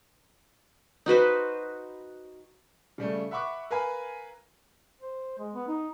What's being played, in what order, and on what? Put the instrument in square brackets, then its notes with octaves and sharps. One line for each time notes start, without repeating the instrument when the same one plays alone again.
[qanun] D#4 F#4 B4 C5
[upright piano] C#3 G3 A3
E5 F#5 B5 C#6 D6 F#6
A#4 B4 F5 G#5 B5
[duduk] C5
G#3
B3
D#4